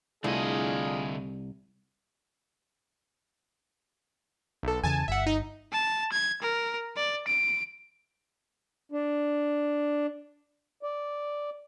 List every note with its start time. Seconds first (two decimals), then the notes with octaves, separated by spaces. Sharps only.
0.24 C2 D3 A3 D4 E4 F4 G#4 D#5
4.63 B1 A4
4.84 E2 C#3 G#5 A5
5.08 G1 E5 F#5
5.26 D#4
5.72 A5
6.12 G#6
6.42 A#4
6.96 D5
7.27 D7
8.92 D4
10.83 D5